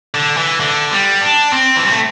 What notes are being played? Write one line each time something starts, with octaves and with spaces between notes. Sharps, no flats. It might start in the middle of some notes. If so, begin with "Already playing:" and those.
D3
E3
D3
G3
D4
C4
E3
G3
A3